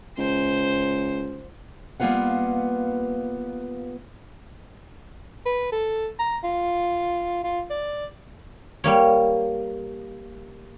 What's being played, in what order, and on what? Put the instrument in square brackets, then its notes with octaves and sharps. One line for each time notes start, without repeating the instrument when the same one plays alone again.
[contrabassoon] C#2 [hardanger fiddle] C5
[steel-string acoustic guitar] G3 A#3 B3 F4 B4 F#5
[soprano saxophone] B4
A4
A#5
F4
F4
D5
[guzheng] G3 A#3 C#5